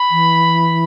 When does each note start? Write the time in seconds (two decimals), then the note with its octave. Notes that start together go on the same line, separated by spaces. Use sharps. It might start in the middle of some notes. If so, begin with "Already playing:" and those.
Already playing: B5
0.11 E3